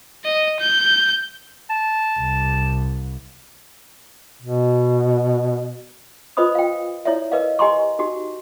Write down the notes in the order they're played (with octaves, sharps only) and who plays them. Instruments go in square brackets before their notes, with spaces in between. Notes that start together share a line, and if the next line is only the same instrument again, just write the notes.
[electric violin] D#5
G6
[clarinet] A5
[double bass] C2
[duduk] B2
[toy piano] F4 B4 C5 D#5 B5 D#6
F5 G5
E4 C#5 D5 E5
A#4 B4 D#5 F5
G4 D#5 G#5 A#5 C6 C#6
D#4 F#4 G4